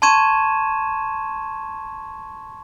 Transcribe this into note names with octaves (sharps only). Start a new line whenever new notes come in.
A5 C6 C#6 G#6 D#7 E7